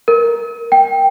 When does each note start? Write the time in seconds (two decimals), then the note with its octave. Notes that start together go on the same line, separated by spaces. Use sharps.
0.08 A#4
0.72 G5